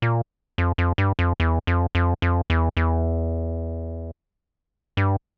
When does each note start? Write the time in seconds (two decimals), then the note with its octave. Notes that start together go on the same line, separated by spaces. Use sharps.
0.02 A#2
0.58 F2
0.78 F2
0.98 G2
1.19 F2
1.40 E2
1.67 F2
1.95 F2
2.22 F2
2.50 E2
2.77 E2
4.97 G2